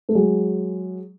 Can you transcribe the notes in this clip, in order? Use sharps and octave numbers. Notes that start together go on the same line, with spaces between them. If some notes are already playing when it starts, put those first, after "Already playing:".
A3
F#3 G#3